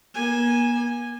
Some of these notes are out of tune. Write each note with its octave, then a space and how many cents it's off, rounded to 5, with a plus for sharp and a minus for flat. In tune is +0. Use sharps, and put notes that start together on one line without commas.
A#3 +45 G#5 -10